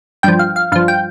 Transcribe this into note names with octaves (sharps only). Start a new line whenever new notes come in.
G2 F3 G5
F5
F5
G2 F3 F5
G5